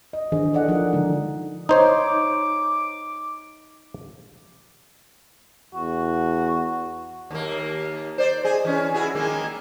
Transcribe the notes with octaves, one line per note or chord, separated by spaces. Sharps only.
D#5
D#3 E3 D4 G#4 C5 D#5
E4 A4 D5 D#5 F#5
F3 D#4 F4 G#4 A#4
D3 E3 F3 G#3 D#4
D#4 C5 C#5 D6
E2 F#4
D#2 A#3
C5 D5
G#4 D#5
E3 C#4
E4 F#4 G#4
D#3 G#3 A#3